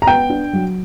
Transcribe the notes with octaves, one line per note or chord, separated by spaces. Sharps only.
A#5
B3 G5
D4
F#3